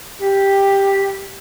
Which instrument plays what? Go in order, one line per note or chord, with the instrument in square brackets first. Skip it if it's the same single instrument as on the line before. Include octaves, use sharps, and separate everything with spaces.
[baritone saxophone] G4